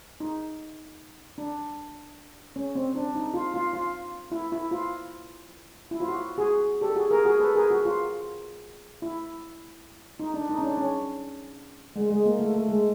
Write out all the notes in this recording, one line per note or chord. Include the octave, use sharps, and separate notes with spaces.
D#4
D4
C#4
C4
D4
D#4
F4
F4
F4
E4
E4
F4
E4
F4
F#4
F#4 G#4
G4 A4
F#4 G#4
G#4 A#4
F#4 G#4
A4 B4
G#4 A#4
F#4
F4
E4
D#4
D4
D#4
C#4
D4
C#4
G#3
G#3
A#3
A3
A3
G#3